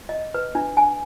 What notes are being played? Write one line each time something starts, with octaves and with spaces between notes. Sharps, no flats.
D#5
B4
D4
G#5